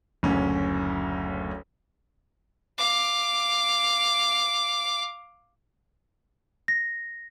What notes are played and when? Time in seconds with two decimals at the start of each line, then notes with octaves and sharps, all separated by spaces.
0.23 F#1 D2 C#4
2.78 F5 D6
6.68 A#6